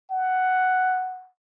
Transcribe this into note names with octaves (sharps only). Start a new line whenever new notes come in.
F#5